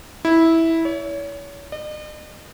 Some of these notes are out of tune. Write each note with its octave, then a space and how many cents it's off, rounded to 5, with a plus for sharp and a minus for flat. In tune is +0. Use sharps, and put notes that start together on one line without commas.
E4 -10
C#5 +35
D#5 -45